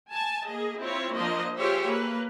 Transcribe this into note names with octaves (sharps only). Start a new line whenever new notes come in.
G#5 A5
A#3 G#4 D#5
C4 E4 F4 C#5
F3 A#3 D4 C5 D#5
F4 G4 G#4 C5 C#5 E5
A#3 B4